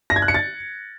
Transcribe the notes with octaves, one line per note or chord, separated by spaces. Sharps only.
A#6
G#6
F#6
C#7
A6